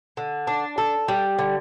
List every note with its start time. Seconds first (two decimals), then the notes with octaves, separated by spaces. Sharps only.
0.17 D3
0.47 D4
0.78 A4
1.08 G3
1.38 D3